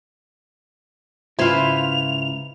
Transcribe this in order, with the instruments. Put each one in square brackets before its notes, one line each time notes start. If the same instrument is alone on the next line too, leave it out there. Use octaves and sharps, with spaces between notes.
[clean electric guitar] G#2 C#3 [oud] E4 F4 [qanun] B4 C5 [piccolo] F7